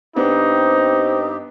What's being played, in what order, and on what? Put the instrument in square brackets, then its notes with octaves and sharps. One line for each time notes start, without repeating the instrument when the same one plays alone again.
[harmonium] G2 C4 G4 [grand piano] B3 D4 [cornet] D#4 [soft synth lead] C5